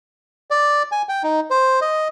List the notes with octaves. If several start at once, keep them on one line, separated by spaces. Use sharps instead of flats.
D5
G#5
G5
D#4
C5
D#5